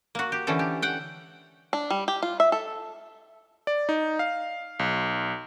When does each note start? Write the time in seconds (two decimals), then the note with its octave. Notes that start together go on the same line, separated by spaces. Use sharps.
0.15 A#3 F#4
0.32 G4
0.47 D3 E3 C#4 A4
0.59 G4
0.82 F#5 G5
1.73 D4
1.90 G3
2.08 G4
2.22 F4
2.40 E5
2.52 A4
3.67 D5
3.89 D#4
4.19 F5
4.79 B1